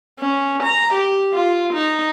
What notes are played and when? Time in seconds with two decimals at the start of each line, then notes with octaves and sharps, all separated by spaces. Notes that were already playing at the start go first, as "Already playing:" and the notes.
0.20 C#4
0.63 A#5
0.94 G4
1.34 F4
1.74 D#4